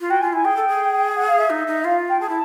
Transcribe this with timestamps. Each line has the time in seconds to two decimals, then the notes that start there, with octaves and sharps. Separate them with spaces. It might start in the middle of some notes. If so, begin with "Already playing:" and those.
0.01 F4
0.10 F#4 G5
0.21 F4 G#5
0.33 E4 G#5
0.44 G#4 G5
0.56 A4
0.68 G#4
1.16 F#5
1.27 F5
1.38 E5
1.50 D#4
1.67 D#4
1.85 F4 F5
2.09 G5
2.21 G#4 A5
2.29 E4